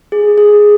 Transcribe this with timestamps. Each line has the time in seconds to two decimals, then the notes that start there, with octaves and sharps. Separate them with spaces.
0.12 G#4
0.38 G#4